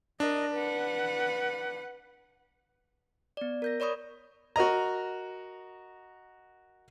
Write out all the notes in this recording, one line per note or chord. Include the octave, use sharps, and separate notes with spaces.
D4 A#4 D#5
B4 F#5
B3 D5
A#4 G6 A#6
C#5 D5 B5 C#6 D#6
F#4 A#4 D#5 A#5